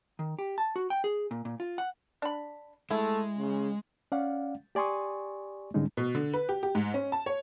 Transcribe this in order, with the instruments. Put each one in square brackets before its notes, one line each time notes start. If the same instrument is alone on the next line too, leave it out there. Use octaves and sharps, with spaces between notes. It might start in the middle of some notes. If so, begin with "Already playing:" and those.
[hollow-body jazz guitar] D#3
G4
A5
F#4
G5
G#4
A#2
A#2
F4
F#5
[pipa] D4 B5
[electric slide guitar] G#3 [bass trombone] A3 [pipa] E4
[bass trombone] C#3
[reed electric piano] C#4 D5 F5 F#5
G4 D5 G#5 C6 C#6 D#6
G#2 D3 G3 G#3 C#4 D#4
[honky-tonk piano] B2
D3
B4
G4
G4
G#2
C#4
A5
C#5